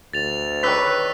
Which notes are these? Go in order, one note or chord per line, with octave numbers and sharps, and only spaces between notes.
D2 A6 F7
D#3 B4 C#5 D5 E6 F#6 B6